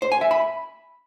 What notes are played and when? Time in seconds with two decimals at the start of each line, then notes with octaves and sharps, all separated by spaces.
0.02 C5
0.12 G#5
0.21 E5
0.31 B5